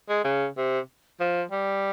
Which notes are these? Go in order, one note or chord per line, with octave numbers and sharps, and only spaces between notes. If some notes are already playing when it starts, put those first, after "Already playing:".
G#3
C#3
C3
F3
G3